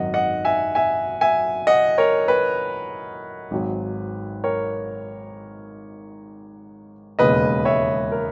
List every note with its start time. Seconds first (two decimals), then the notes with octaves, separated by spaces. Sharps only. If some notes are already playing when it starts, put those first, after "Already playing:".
Already playing: G#1 F#2 D#3 D#5 F#5
0.14 D#5 F#5
0.45 E5 G#5
0.75 E5 G#5
1.21 E5 G#5
1.67 D#5 F#5
1.98 A#4 C#5
2.28 B4
3.51 G#1 G#2 F#3
4.44 A#4 C#5
7.19 E1 D#2 C#3 G#3 B4 D#5
7.65 C#5 E5
8.12 A#4